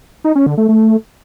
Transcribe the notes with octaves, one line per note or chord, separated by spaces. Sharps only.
D#4
C#4
D3
A3
A3